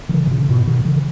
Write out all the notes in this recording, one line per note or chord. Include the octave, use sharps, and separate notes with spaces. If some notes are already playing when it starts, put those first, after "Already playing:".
D#3
C#3 E3
B2
A#2 C#3
G#2 B2
B2 D#3
C#3 E3